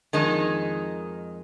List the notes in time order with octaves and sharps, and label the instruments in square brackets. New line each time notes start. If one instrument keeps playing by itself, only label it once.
[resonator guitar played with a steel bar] F2 D#3 G#3 D#4